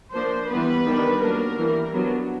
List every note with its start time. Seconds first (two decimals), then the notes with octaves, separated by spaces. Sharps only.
0.14 F3 A#3 D4 C5
0.50 E3 G3 B3 B4
0.87 D#3 G3 B3 D4
1.22 F#3 A#3 D4 A#4
1.58 E3 G3 A#3
1.95 F#3 B3 D4